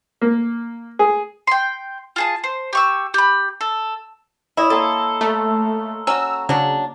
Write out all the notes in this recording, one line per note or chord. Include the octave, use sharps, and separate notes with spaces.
A#3
G#4
G5 C6
F4 G#4 A5
C5
G4 C#6 E6
G4 B5
A4
E4 C#5 D#5
A#3 A4 C6 D#6
A3 A#4 F5
C#4 F#4 A#5 E6
C#3 F#3 D4